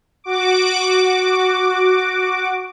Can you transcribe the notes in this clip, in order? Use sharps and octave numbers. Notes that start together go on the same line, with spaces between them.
F#4 D6